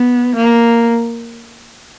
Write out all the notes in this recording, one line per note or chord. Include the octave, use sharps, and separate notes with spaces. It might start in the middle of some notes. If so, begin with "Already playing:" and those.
Already playing: B3
A#3